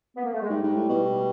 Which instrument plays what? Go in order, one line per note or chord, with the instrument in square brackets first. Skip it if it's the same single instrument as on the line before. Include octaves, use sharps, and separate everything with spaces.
[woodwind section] B3
A#3
A3
G#3
[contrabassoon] G#2 [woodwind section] G3
[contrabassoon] G#2
A2
B2